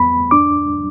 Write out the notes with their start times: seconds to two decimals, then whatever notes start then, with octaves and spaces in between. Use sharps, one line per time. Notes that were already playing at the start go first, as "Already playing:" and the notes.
Already playing: E2 B3 B5
0.31 D4 D6